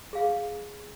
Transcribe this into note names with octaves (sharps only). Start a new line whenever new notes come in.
G#4 F5